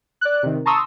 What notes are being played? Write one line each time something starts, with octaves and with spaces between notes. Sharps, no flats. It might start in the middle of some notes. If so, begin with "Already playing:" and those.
D5 F#6
C3 D#3
A5 A#5 C6 C#6 D#6 E6